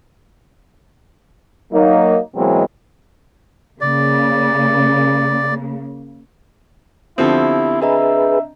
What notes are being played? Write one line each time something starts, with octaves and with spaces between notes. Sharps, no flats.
F#3 A#3 D#4
B2 E3 F#3 G#3 A#3 C4
C#3 A#3 D5
D3 F3 B3 C4 E4 G4 D#6
D4 G#4 B4 D#5 E5 A#5